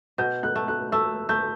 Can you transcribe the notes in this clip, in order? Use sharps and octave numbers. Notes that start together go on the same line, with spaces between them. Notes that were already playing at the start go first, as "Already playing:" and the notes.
B2 G6
F#6
A3
F#6
A3 E6
A3 G6